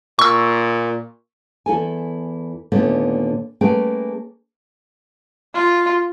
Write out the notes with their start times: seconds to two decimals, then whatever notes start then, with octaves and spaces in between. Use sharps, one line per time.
0.19 A#2 C#6 E6
1.66 E2 E4 A4 G#5
2.72 D#2 A#2 D3 A3 B3 C#4
3.61 A3 A#3 C#4 G#4 B4 G5
5.55 F4